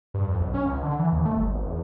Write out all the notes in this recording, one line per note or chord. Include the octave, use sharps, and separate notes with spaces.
G2
F2
B1
C#4
C#2
D3
E3
D#2
A3
G1
G#1
E2